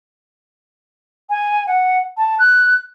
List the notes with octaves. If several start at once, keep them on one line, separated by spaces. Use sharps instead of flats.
G#5
F#5
A5
F#6